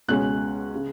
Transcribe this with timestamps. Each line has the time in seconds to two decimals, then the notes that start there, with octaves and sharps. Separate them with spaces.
0.08 C#2 B2 G#3 C#4 F#6
0.75 C#3